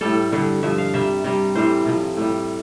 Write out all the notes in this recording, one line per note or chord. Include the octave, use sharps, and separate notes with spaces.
A2 G3 A4
G2 D3 G3
G2 F3 E5
F5
C3 G3 E5
C3 G3
A2 E3 G3 C5
C3 F3
A2 G3